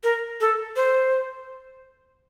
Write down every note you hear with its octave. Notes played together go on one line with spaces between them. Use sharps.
A#4
A4
C5